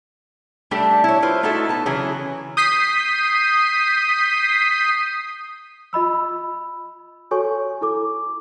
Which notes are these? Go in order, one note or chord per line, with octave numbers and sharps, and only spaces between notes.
G3 A3 D4 G4 A4
E4 C#5
E4 F4 B4 C5
A3 D#4 E4 F#4 A4 E5
B3 A5
C#3 E3 F#3 F#4 G#4
D#6 G6 B6 C7 D#7
F4 D#5 B5 E6
F#4 A4 C#5 G#5 C#6
E4 A4 D6